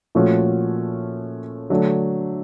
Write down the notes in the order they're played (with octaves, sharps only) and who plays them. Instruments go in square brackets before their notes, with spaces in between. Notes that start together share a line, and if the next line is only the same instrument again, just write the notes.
[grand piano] A#2 F3 A3 C#4 F#4
D3 F#3 A3 D4